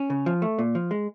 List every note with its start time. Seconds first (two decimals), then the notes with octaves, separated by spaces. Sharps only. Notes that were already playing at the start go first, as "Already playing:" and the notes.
Already playing: C#4
0.10 C#3
0.26 F3
0.42 A3
0.59 A#2
0.75 F3
0.91 G#3